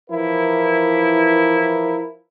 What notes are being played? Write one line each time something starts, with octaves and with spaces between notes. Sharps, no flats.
E3 F3 E4 A#4